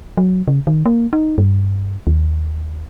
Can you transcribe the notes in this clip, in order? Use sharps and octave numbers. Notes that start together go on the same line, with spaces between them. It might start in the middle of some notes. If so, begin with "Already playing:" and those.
F#3
C#3
D#3
A#3
D#4
G2
D#2